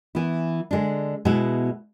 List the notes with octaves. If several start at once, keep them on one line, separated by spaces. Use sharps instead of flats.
E3 B3 E4
D3 G#3 D4
B2 G#3 B3 E4